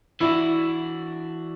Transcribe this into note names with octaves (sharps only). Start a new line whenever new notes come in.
E3 D4 E4 F#4